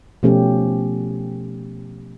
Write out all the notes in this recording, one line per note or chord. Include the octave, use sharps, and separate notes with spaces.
B2 F3 A3 C#4 G4